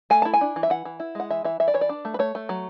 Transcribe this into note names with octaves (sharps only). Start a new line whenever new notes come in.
A3 G#5
E4 A5
G#5
D4
E3
E5
E3 F#5
E3
E4
G#3 F#5
E3 E5
E3 E5
E3 E5
D5
E3 C#5
D5
D4
A3
B4
A3 C#5
A3
F#3